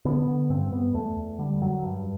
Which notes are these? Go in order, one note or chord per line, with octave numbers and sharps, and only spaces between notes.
D3 B3
D3
G2 C4
G2 B3
E2 A3
E2
D3 G3
F#2 F#3
G2